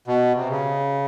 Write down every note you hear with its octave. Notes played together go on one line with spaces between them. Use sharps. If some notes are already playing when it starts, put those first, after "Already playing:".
B2
C3
C#3